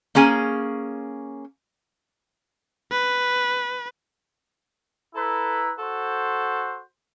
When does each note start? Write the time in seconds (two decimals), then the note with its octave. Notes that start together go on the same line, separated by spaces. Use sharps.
0.15 A#3 C#4 G#4 G#5
2.92 B4
5.16 E4 A4 B4 A#5
5.79 F#4 A4 C5